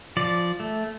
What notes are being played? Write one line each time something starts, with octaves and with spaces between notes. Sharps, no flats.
F3 D5
A3